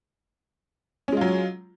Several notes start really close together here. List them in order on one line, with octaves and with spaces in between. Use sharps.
C#4 G#3 F4 F#3